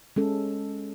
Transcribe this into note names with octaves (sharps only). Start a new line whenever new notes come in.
G#3 C#4 A4